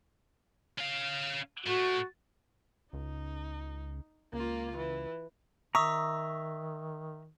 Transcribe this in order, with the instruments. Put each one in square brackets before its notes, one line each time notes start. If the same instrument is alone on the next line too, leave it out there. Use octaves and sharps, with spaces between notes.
[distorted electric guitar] C#4 F5
[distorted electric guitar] A2 A3 [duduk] F#4
[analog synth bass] C#2 [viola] D#4
[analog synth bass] C#2 [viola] A#3 F4
[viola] E3
[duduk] D#3 [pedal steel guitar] E5 A#5 [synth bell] C#6 D#6